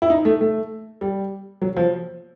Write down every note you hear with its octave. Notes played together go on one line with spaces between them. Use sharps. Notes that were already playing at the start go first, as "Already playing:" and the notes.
E4
D#4
A3
A3
G3
F#3
F3